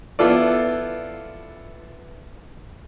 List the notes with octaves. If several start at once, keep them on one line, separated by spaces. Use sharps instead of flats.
B3 E4 F4 A4 D5